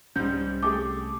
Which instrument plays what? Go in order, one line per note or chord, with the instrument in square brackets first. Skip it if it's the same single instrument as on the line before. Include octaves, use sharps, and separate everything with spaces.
[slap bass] C2 C3 C#4 [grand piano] G#2 G3 [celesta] G6
[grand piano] A3 G4 G#4 [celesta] D6